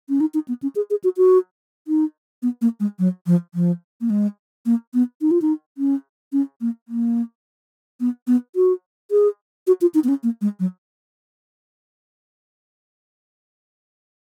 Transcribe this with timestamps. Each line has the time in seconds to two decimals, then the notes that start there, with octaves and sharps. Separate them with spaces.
0.09 C#4
0.20 D#4
0.34 D#4
0.48 B3
0.62 C#4
0.76 G#4
0.90 G#4
1.04 F#4
1.17 F#4
1.88 D#4
2.43 B3
2.61 A#3
2.80 G#3
2.99 F#3
3.26 F3
3.54 F3
4.01 A#3
4.10 G#3
4.66 A#3
4.94 B3
5.21 D#4
5.31 F4
5.42 D#4
5.78 C#4
6.32 C#4
6.61 A#3
6.88 A#3
8.00 B3
8.27 B3
8.56 F#4
9.11 G#4
9.67 F#4
9.81 F4
9.94 D#4
10.04 B3
10.08 C#4
10.23 A#3
10.41 G#3
10.60 F#3